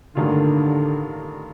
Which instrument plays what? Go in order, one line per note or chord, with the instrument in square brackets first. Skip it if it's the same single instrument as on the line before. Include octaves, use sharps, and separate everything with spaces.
[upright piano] A1 G2 D#3 A#3 F4 [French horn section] D3